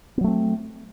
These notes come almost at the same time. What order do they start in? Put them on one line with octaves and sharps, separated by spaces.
B3 F#3 A3 C4